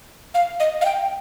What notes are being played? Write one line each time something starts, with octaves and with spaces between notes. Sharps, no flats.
F5
D#5
F5
G5